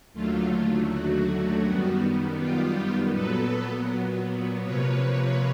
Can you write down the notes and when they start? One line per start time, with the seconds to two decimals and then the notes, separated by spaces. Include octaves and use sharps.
0.14 D#2 D3 F#3 A3 F4
0.90 F#4
1.64 F#2 D#3 G3 B3
2.39 F4 G4
3.13 A#2 F#3 B3 A4 B4
4.63 C3 F3 A#3 B4 C#5